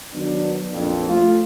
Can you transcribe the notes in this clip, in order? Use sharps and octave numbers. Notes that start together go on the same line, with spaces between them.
D#3 F#3 B3 D4
A#1 F2
A3 F4